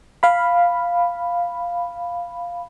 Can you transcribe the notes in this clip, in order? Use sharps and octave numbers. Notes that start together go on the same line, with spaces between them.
F5 B5